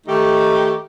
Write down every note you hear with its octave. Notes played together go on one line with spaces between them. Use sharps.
D#3 A3 D#4 G4